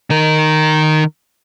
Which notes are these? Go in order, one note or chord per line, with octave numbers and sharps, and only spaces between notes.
D#3 A#4